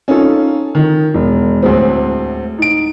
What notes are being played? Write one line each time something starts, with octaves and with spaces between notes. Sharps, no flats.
C#4 D#4 F4 A4
D#3
E1
D2 A2 G#3 C4
D#4 D7